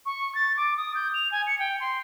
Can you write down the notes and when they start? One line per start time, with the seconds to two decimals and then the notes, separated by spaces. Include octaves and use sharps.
0.06 C#6
0.35 A6
0.57 D6
0.77 D#6
0.95 G6
1.14 F7
1.32 G#5
1.47 C#7
1.59 G5
1.80 C6